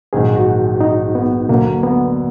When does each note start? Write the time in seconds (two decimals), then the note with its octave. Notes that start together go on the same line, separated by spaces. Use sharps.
0.13 A#1 G#2 D#3 F#3 A#3 G#4
0.36 F#4
0.81 D#4
1.15 B3
1.49 D2 D3 F#3 A#3
1.83 B3